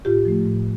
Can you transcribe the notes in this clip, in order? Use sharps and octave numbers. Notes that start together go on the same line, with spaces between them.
A2 F4 G4
F3 A3
A2